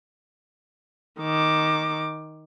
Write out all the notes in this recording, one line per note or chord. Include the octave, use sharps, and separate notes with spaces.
D#3 D6